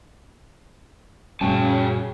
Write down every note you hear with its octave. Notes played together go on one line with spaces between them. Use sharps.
F#2 A#2 C#3 G3 C#4 F#4 G5 A5